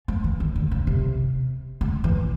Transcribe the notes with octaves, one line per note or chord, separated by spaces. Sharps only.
F3
E3
D#3
D3
C#3
C3
C#3
E3